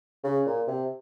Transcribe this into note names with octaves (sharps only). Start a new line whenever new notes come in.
C#3
A#2
C3